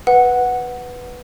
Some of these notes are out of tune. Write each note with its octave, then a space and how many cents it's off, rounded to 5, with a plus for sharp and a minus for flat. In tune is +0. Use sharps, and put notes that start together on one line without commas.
B4 +0 F#5 +0